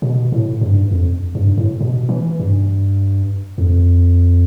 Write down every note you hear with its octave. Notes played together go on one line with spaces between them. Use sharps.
B2
A2
G2
F2
G2
A2
B2
E3
G2
F2